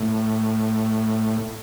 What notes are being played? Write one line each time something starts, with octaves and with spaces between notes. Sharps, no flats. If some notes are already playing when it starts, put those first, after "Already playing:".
Already playing: A2